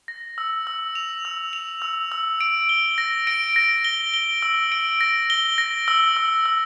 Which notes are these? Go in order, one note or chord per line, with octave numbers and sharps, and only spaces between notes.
A#6
E6
E6
F7
E6
F7
E6
E6
D7
G7
A#6
D7
A#6
G7
G7
E6
D7
A#6
G7
A#6
E6
E6
E6